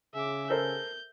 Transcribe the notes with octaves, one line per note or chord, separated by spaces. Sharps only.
C#3 G#4 E5 D6
A4 A#4 C5 G6